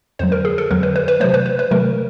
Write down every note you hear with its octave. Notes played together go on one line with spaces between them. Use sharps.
F2 D3 F#3 C5
A#4
G#4
A4
F2 D3 F#3 A#4
B4
B4
B4
C3 D#3 F#3 A3 C5
B4
B4
B4
C3 D#3 F#3 A3 A#4